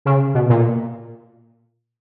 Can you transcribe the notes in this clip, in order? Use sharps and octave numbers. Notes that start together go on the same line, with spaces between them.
C#3
B2
A#2